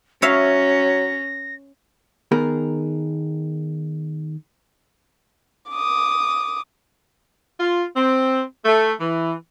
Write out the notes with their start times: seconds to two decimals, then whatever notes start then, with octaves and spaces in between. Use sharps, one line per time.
0.22 F#3 C#4 C#5 E5 F5 A#6
2.31 D#3 B3 G#4 A#4
5.70 D6 D#6
7.60 F4
7.96 C4
8.65 A3
9.00 E3